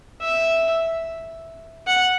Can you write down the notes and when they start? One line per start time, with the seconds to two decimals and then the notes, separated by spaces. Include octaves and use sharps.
0.21 E5
1.87 F#5